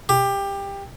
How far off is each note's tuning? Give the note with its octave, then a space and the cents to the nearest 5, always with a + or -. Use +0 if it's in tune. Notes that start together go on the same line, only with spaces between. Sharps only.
G4 +20